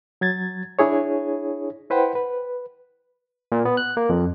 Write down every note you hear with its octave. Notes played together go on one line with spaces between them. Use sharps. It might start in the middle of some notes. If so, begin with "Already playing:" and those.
F#3 G#6 A6
D4 E4 G#4 C#5
E4 B4 C5 F#5 G5
B4
A#2
B3
F#6
A#3
F2